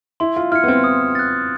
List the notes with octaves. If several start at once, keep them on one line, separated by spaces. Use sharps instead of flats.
E4 C6
F4
E4 F6 G#6 C#7
B3
C4
D#6
F#6 A6